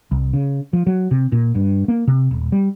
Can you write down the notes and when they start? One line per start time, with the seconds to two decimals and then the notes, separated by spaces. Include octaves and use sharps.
0.11 C2
0.33 C#3
0.73 F3
0.87 F#3
1.11 C3
1.32 A#2
1.55 G2
1.88 A#3
2.07 C3
2.31 D#1
2.52 G3